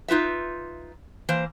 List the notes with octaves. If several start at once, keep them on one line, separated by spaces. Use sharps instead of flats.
D#4 F4 B4 E5
E3 A#3 C5